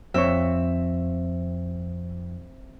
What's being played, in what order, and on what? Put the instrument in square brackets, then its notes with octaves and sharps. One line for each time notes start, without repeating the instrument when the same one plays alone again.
[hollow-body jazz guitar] F2 C#5 [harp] C4 E5